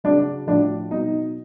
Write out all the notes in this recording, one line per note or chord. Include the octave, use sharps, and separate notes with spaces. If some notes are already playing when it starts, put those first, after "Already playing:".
C#3 F#3 D4
A2 F3 D4
B2 F#3 D#4